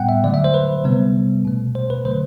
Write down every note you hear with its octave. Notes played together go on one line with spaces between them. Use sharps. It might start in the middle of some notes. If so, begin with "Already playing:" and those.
Already playing: A2 G3 B3 F#5 G5
E5
D3 F#3 A3 D5
E5
C5
B4
C3 G3 B3
B2 A3
C5
B4
D3 F#3 A3 C5